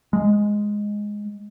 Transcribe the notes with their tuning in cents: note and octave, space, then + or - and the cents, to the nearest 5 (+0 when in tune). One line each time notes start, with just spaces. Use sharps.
G#3 +0